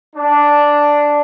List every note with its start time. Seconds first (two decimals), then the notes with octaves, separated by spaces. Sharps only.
0.15 D4